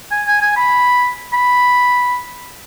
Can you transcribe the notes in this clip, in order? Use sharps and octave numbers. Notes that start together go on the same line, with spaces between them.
G#5
G#5
G#5
B5
B5